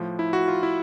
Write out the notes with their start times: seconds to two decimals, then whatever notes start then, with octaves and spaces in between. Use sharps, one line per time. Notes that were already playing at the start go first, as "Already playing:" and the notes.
Already playing: A2 F3
0.19 E4
0.33 F#4
0.48 F4
0.63 E4